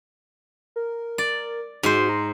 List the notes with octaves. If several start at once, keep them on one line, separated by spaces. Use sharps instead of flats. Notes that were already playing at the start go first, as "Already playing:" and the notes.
A#4
D5
G#2 F#4 C5
A#5